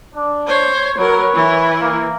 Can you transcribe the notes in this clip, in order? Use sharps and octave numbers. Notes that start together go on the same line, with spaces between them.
D4
C5 C#5
F#3 A#4 B4 C#5
E3 E4
A#3